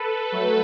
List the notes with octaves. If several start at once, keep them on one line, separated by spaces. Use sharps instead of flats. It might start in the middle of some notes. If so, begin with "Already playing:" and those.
Already playing: A4 B4
F#3 A3